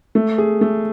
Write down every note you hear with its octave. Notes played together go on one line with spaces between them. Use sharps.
A3
G#4
A3